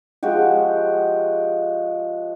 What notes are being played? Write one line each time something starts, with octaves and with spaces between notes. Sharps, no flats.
F3 G#3 F#4 G4